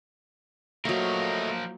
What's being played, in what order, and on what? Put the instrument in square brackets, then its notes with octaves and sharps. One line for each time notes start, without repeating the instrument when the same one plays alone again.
[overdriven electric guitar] F3 A#4 [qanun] F#3 A#3 [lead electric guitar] A3 D#5